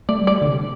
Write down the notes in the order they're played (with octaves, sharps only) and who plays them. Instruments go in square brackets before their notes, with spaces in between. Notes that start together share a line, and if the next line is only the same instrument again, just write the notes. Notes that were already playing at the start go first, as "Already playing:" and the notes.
[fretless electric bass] A3 [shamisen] D5
[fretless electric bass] G3
[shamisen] D5
[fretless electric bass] D3
C3